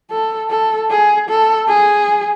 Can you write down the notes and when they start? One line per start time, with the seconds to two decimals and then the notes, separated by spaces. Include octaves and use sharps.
0.11 A4
0.50 A4
0.91 G#4
1.29 A4
1.69 G#4